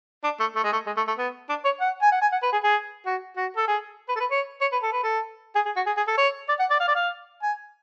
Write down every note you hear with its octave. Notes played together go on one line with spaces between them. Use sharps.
D4
A3
A3
G#3
A3
G#3
A3
A3
B3
D4
C#5
F#5
G#5
F#5
G#5
F#5
B4
G#4
G#4
F#4
F#4
A4
G#4
B4
A4
B4
C#5
C#5
B4
A4
B4
A4
G#4
G#4
F#4
G#4
G#4
A4
C#5
D5
F#5
D5
F5
D5
F5
G#5